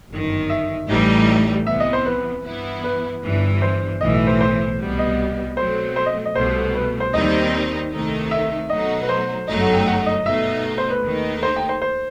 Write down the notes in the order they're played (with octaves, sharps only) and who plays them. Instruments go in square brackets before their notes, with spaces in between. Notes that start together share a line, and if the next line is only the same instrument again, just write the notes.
[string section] G1 F#2 D#3
[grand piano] E5
[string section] A1 A2 E3 G3 D#4
[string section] C2 C3 E3 B3 [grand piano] E5
[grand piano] D#5
C5
B4
[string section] G2 E3 B3 E4
[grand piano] B4
[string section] G1 G2 E3
[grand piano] C5
[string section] B1 A2 E3 [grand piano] D#5
[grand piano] E5
C5
C5
[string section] C2 B2 G3 B3
[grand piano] D#5
[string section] B2 F#3 A3 C4 [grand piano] C5
[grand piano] C5
D#5
D#5
[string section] C2 B2 A3 [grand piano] C5
[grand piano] B4
C5
[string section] D#2 D#3 G3 C4 D#4 [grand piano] D#5
[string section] C2 C3 D#3 A3 D#4
[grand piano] E5
[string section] B2 F#3 A3 D#4 F#4 [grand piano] D#5
[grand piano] B4
C5
[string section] G1 F#2 F#3 A3 D#4 [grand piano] D#5
[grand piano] F#5
G5
F#5
D#5
[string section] B2 A3 D#4 [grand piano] E5
[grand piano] C5
B4
[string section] D#2 D#3 A3 D#4
[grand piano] C5
G5
C5
C5